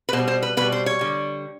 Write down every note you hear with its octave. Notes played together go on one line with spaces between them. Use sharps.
B4
B2 C5
G3
C5
B4
B2 G3 B4
C5
C#5
D3 G3